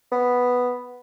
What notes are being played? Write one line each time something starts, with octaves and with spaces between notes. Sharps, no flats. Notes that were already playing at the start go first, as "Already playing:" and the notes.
B3